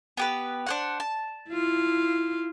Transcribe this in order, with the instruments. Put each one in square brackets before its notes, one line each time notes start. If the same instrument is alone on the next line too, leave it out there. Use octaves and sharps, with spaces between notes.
[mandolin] B3 G4 B4
D4 C5 F#5
A5
[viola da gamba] E4 F4